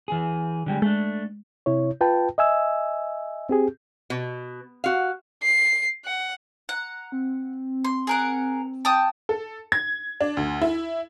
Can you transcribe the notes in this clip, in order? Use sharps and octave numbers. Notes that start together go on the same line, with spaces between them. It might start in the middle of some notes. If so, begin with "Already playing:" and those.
E3 G#4
D3 G3 G#3
G#3 A3 D4
C3 E4 C#5
F4 B4 G5 A5
D#5 E5 G#5 E6
C4 G4 G#4
B2
F#4 F5
C7
F#5
F#5 A#5
C4
C6
G#4 A#4 F#5
G5 A5 D#6
A4
G#6
D4
D2
E4